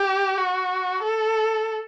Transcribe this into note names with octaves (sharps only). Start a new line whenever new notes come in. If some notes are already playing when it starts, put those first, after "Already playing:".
Already playing: G4
F#4
A4